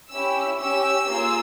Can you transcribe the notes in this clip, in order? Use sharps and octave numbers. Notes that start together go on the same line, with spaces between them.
C#4 E4 G4 E6
C#4 G4 E6
A#3 F4 G#4